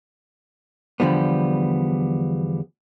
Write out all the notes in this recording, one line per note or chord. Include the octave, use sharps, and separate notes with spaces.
E2 D3 F3 G3 B3